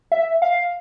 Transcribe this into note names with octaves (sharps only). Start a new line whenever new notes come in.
E5
F5